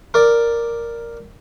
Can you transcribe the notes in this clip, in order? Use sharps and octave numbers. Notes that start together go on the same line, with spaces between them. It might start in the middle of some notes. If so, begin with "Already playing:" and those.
A#4 D5